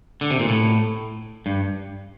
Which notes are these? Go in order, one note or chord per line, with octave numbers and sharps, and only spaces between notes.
D3
C3
A#2
A2
G2